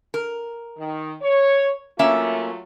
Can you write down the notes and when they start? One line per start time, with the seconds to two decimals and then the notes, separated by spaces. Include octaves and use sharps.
0.14 A#4
0.78 D#3
1.22 C#5
1.99 F#3 A3 A#3 C#4 F4 E5